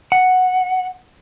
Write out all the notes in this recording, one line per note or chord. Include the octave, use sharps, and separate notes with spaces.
F#5